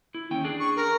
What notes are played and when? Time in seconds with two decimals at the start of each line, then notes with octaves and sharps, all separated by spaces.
0.15 E4
0.31 D#2 C#4 G5
0.44 D4 G#4
0.60 C#6
0.76 A#4